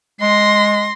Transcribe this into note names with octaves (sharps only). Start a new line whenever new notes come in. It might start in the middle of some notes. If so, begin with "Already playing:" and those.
G#3 C6 A#6